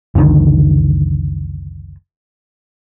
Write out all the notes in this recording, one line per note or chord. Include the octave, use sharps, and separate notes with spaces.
F#1 C#2 D3 D#3